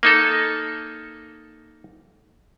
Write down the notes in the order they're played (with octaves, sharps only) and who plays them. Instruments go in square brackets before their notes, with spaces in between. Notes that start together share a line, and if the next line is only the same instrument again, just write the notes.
[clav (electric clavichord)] A#3 D#4 A4